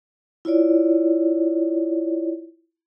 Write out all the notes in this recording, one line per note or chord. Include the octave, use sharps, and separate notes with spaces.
E4 F4 C#5 D5